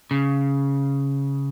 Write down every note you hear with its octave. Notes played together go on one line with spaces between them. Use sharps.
C#3